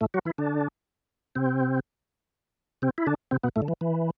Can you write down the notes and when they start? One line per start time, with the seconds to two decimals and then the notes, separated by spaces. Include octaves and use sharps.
0.01 A2 A3
0.14 F#3 F#4
0.25 E3 E4
0.38 D3 D4
1.35 C3 C4
2.82 C3 C4
2.98 E4
3.07 D3 D4
3.31 C3 C4
3.43 B2 B3
3.56 A2 A3
3.62 D3
3.68 E3
3.81 E3